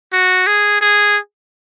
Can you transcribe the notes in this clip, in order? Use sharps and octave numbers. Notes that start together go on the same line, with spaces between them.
F#4
G#4
G#4